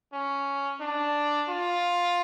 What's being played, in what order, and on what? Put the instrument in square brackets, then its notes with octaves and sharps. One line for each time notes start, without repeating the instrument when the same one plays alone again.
[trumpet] C#4
D4
F4